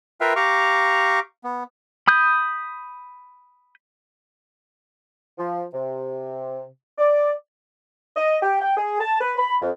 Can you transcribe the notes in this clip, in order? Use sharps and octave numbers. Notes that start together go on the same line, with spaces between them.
F4 A#4 B4 E5 F5 G5
G4 F5 A#5 C#6 D6
B3
B5 D#6 G6
F3
C3
D5
D#5
G4
G5
G#4
A5
B4
B5
F2